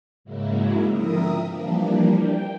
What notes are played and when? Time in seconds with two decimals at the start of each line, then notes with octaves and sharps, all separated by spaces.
0.24 G#2 C#3 F#3 G#3 A#3 E4
0.89 D3 F3 C4 A#4 E5 D#6
1.47 E3 F3 G3 A#3 D4
2.18 G5